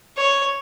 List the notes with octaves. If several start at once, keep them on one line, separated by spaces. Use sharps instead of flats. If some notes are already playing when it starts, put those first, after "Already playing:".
C#5